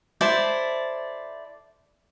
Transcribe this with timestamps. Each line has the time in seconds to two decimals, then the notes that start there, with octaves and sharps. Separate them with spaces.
0.21 E4 A4 C5 D5